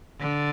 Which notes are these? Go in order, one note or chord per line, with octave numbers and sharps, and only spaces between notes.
D3